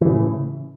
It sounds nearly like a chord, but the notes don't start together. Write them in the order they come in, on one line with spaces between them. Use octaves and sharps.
E3 C#3 A2